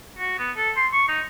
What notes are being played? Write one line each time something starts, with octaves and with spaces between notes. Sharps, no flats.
F#4
B3
A4
C6
C#6
D#4